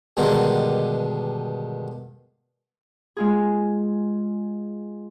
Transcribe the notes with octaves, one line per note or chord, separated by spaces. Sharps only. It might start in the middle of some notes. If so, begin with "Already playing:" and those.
G2 B2 D3 D#3 G#3 D#4
G#3 F4 G#4